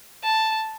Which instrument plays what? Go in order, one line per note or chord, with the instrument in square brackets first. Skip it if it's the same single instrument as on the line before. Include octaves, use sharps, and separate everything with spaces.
[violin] A5